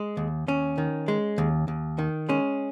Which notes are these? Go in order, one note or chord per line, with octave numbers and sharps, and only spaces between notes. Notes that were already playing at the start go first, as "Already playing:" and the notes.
Already playing: G#3
D#2
D#2 C#4
D#3
G#3
D#2
D#2
D#3
G#3 C#4